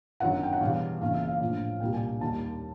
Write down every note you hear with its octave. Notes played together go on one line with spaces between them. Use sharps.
G1 F#2 D#3 F#3 F#5
G5
F#5
E2 B2 G3 F5
F#1 E2 C#3 F5
E5
F5
A#1 A2 F3
C2 A#2 G3 G5
G#5
G#5
D#2 D#3 G3 A5